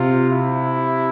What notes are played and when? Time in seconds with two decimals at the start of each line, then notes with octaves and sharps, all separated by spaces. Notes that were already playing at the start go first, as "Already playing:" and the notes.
Already playing: C3 F4
0.31 E4